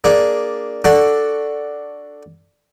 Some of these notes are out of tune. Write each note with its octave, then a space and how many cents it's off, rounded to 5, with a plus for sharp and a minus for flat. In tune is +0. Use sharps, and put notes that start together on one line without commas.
A#3 +0 D4 +0 G#4 +0
D4 +0 F#4 +0 A4 +5